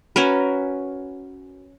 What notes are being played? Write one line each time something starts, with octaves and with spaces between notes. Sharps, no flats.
C#4 F#4 A#4 B4